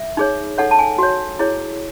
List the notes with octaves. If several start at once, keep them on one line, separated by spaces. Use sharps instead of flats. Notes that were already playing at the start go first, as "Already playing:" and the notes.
Already playing: E5
D#4 G#4 C#5
D#4 A4 C#5 F#5
A5
G#5
F#4 C#5
E4 G#4 C#5